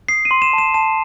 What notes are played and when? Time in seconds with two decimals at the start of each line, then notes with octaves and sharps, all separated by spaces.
0.09 D#6 C7
0.25 D#7
0.31 C6
0.42 E7
0.53 A5
0.58 E7
0.74 A5 E7